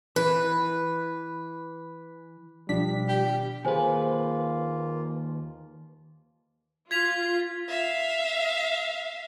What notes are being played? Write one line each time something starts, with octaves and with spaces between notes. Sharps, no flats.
E3 B4
B2 D#3 F3 G3 D4 B6
G4
D#2 A#3 F4 G#4 B4 C5 G#5
F4 G#6 B6 F7
E5 F5